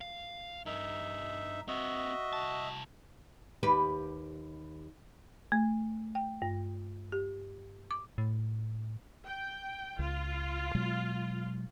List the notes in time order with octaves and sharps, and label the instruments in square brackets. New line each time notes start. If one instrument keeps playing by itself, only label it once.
[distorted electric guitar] F5
[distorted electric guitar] G2 A#4 [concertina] D#4 E5
[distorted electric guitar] C4 B4 [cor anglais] F#4 [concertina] D#5 E5
[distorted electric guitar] C2 A5
[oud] D#2 G4 B4
[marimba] A3
G5
G2
G4
D6
[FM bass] A2
[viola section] G5
[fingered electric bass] C#2 [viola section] F4
[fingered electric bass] B2 F#3 G#3